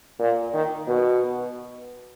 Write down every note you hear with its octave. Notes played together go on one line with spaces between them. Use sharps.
A#2
D#3
B2